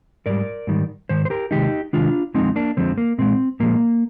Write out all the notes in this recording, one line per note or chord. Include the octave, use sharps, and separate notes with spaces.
G#2 G3 A#4 D5
G#2 D#3 G3
G#2 D#3 C5
C5
G4 A#4
C3 D#3 G#3 D#4 G4
C3 D#3 G#3 D4 F4
F2 D3 F3 G#3 C4 D#4
A#3 D4
F2 D3 F3 G#3 C4
A#3
A#2 F3 G#3 C4
A#2 F3 G#3 A#3